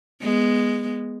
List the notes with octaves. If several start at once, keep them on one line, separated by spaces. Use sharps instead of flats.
G#3 B3